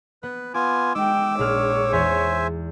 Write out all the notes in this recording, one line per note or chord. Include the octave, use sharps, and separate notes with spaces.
B3 B4
B3 F4 G#5 D6
G#3 D#4 G5 D6 E6
A#1 G#3 C#5 F6
E2 C5 E5 G#5